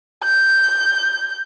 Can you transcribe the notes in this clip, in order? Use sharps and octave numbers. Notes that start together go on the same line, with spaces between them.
G6